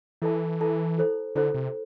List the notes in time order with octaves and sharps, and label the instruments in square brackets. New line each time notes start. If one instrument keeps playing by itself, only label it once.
[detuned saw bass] E3 [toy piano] E4 A4 E5 A5
[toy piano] E4 A4 E5 A5
E4 A4 C5
[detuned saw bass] D3 [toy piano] E4 A4 C5
[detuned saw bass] C3